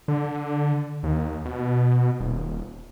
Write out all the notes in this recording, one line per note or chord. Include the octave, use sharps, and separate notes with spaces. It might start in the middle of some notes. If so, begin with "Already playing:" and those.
D3
D#2
B2
D#1